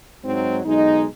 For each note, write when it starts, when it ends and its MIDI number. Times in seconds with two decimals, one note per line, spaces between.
0.24 0.61 44
0.24 0.61 54
0.24 0.61 60
0.24 0.61 63
0.65 1.05 35
0.65 1.05 56
0.65 1.05 63